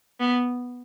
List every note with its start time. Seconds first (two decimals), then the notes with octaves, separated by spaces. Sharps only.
0.20 B3